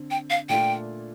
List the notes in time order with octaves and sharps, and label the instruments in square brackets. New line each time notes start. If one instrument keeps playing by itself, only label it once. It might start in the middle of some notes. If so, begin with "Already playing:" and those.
Already playing: [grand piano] D3 C4
[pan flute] G5
F5
[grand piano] A#2 A3 D4 F4 [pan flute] G5